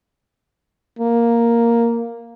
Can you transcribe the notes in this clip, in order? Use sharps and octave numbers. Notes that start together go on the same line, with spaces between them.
A#3